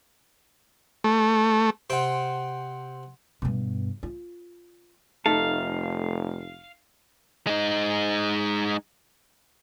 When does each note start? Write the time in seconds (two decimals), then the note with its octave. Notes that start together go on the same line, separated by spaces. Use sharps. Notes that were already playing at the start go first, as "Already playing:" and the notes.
1.04 A3
1.90 C3 C4 F#5 G5 C6
3.42 G2 B2
4.03 F4
5.26 F1 A3 D#4 A4 F5
7.47 G#3 D#4